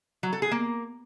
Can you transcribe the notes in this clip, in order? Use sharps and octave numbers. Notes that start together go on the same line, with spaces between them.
F#3
A4
G#4
A#3